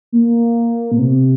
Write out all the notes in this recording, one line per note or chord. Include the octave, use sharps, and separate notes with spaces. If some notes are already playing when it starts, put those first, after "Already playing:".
A#3
A#2
C3